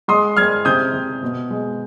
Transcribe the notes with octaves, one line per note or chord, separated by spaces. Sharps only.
G#3 C6 D#6
G#3 F6 G#6
C3 D#6 G6
C3
B2
G#3